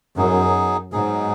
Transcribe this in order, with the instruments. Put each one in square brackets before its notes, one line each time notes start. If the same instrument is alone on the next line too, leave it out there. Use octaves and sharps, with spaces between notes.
[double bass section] F#2 [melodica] F#3 B3 D#4 G#4
[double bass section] G#2 [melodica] F#3 B3 D#4 G#4